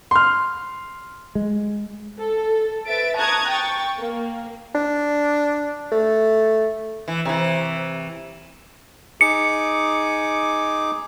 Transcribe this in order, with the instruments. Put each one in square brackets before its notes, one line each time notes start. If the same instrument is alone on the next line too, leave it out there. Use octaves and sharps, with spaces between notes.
[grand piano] C6 F6
[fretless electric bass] G#3
[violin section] A4
B4 E5 A6 D7
A5 A#5 C#6 D#6 F#6 G#6
G5 C#6 A6
A#3
[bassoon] D4
A3
[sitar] E3
C3 E3
[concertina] D#4 G#4 D6 [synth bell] C#7